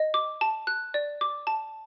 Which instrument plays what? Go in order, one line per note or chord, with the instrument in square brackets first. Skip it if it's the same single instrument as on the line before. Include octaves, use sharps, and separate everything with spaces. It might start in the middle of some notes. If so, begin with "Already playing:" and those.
Already playing: [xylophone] D#5
D6
A5
F#6
D5
D6
A5